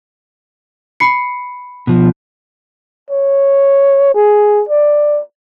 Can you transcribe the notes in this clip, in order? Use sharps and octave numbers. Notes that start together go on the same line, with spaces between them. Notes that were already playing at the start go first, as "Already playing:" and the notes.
B5 C7 C#7
B2 F3
C#5
G#4
D5